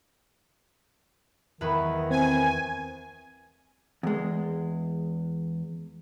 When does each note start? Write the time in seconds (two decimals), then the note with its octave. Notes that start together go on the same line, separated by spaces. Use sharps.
1.61 E2 D#3 B4
2.11 C4 G#5
4.03 E2 G#3